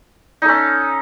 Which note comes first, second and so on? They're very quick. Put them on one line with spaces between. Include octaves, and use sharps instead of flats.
D#4 A4 C#4